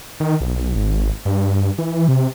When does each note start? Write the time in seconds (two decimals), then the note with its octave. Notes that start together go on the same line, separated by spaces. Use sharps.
0.20 D#3
0.41 B1
0.76 G#1
1.25 G2
1.78 E3
2.08 C3